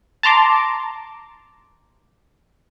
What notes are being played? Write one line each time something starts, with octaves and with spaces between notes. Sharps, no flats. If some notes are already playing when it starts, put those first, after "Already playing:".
A5 A#5 C6 D6